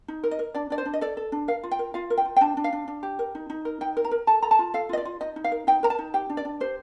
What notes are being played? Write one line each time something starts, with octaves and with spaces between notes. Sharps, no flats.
D#4
A#4
D#5
A#4
D4 D5
D4 D5
C5
D4
D#5
A4 D5
A4
D4
A#4 F5
F4
G5
A#4
F4 F5
A#4
G5
F4
G5
D4 A5
D4
F5
D4
D4
G4
A#4
D#4
D#4
A#4
D#4 G5
A#4
A#5
A#4
A4 A5
A4 A#5
A5
F4
A4 F5
F4 D#5
D5
F4
D#4 D#5
D#4
F5
A#4
D#4 G5
A#4 A#5
A5
D#4
G4 G5
D4
D5
D4
G4 C5